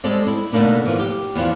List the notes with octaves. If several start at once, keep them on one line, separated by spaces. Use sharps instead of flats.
G3 G#3 C4 A4 D5
E4
B2 D3 A3 A#3 D4 D#4
E3 F3 A#3
G4
E2 D3 F3 C4